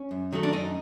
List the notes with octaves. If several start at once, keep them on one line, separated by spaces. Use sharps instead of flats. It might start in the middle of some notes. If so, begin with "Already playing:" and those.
Already playing: C#4
F#2
D#3 F#3 A3
D4
F#2 D#4